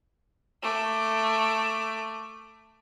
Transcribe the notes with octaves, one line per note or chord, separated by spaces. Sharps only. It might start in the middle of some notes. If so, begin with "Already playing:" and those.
A3 D6